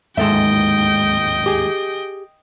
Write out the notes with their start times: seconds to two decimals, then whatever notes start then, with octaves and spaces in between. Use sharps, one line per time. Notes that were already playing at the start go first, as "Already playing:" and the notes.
0.17 D1 D#2 G#2 G#3 A4 D#5 E5 G5
1.46 G4 G#4